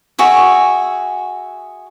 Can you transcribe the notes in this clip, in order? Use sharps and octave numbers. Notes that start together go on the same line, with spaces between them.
F#4 G#4 E5